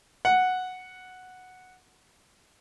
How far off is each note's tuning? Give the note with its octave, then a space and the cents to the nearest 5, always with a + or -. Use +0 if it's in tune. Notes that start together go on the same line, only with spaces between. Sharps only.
F#5 -5